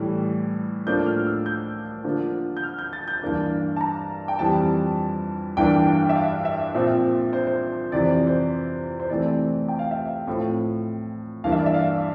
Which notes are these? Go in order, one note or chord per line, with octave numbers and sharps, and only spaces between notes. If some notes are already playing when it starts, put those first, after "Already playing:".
Already playing: A2 E3 G3
A2 F3 A#3 D4 G6
F6
E6
G6
D3 F3 A#3 D4
G6
F6
G6
A6
G6
G2 E3 A#3 D4
A5
A#5
G5
F2 E3 G3 A5
G2 E3 A#3 D4 G5
G5
E5
F5
E5
A#2 F3 C4 E5
C5
C5
F2 C3 E3 D5
C5
C5
C5
C3 E3 A3 C4 D5
G5
F5
E5
F5
A2 F3 C4
G2 E3 A#3 F5
E5
D5
E5
F5